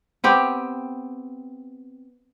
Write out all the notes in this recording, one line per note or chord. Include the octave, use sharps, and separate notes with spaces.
B3 C4 G4